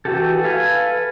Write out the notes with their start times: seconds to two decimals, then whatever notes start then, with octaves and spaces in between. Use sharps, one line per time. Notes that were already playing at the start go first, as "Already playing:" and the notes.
0.05 E3 F#4 G4 A4
0.44 A4 B4 F5 G#5